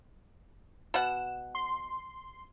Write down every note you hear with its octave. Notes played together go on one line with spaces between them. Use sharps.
B2 F#5 E7
C6